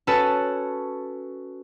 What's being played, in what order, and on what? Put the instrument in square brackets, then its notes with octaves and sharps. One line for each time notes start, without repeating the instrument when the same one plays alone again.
[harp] C#4 F#4 A4 B4 C#5 A5